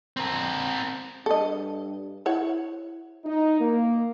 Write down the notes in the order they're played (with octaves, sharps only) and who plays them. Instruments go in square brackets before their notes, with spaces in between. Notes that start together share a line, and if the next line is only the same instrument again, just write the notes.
[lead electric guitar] C4 A#4
[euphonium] G2 [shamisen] A4 D#5
[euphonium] E4 [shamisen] C5 C#5 F#5
[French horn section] D#4
A#3